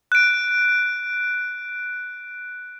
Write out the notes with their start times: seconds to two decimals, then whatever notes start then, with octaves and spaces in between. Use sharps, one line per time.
0.12 F#6 D7